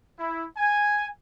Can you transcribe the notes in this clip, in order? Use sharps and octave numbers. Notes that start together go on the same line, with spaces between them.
E4
G#5